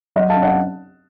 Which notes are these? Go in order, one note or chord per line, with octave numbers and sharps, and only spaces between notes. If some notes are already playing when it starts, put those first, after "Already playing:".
F#3 D#5 F#5
F5 A5
C#4
D#5 F#5